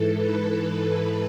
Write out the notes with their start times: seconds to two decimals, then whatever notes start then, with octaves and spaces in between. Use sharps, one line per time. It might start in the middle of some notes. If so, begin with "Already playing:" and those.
Already playing: G#2 E3 A4
0.16 B4